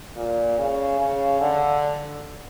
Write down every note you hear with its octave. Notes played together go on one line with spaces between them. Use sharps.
A#2
C#3
C#3
D3